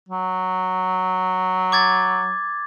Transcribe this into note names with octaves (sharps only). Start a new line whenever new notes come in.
F#3
D6 G#6 A6